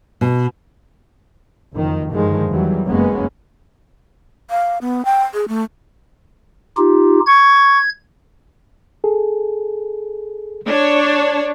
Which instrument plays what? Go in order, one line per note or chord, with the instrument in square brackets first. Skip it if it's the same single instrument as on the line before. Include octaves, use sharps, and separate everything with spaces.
[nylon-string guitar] B2
[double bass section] F#1 F2 D#3
G2 D3 D#3 F3 G#3
E2 E3 F#3 G3
F#1 F#2 G#3 A#3 B3 C#4
[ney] F5
B3
G5
G#4
A3
[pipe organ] D#4 F4 G4
[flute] C#6 [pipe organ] G#6
[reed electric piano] G#4 A4
[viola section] D4 C#5